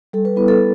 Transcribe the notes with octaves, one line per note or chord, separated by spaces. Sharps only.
G3 A4
B4
B3 E4 B4
A4